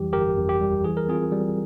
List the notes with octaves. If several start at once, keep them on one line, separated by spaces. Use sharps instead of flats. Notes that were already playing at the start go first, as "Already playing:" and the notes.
Already playing: F2 E3 G3 G4
G1 G4 A#4
F2
G4
G3
E3 G#4
A#4
C4 F4 G#4
G3